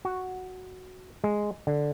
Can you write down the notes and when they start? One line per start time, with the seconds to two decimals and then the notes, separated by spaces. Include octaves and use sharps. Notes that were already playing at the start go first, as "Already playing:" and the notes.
0.05 F#4
1.24 G#3
1.67 D3